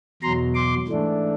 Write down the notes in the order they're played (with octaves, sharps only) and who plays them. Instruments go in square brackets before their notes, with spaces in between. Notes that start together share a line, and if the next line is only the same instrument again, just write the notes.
[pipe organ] E2 B2 F#3 A#5 C6
C6 D6
G#2 E3 A3 D4